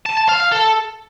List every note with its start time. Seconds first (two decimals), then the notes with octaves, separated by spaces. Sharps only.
0.06 A5
0.17 A5
0.29 F5
0.41 F5
0.52 A4